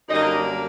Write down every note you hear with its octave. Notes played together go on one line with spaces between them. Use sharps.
F#2 D3 G3 A#3 D#4 D#5